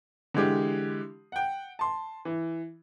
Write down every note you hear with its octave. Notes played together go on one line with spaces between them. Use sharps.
D3 E3 G#3 G4
F#5 G5
A5 C6
E3